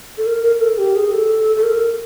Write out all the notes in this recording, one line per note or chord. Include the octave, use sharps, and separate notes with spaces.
A4
A#4
A#4
A4
G4
G#4
A4
A4
A#4